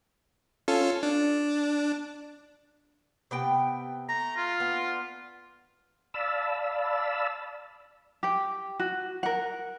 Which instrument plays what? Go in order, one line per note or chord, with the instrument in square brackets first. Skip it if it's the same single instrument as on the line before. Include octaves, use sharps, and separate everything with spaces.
[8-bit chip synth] C#4 F4 A4
D4
[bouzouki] C3 B3 G5
[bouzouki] A3 [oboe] A#5
[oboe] F4
[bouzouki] B3 D4
[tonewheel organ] D5 F5 A5 B5 E6
[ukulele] G4 G5
F#4
A#4 F#5